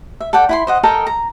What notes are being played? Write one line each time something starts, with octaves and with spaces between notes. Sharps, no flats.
E5
A4 D5 F#5 G5
E4 B5 C6
C5 D#5 F#5
A4 A#4 D#5 G5
A#5